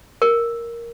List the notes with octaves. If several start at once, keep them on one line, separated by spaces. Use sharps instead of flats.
A#4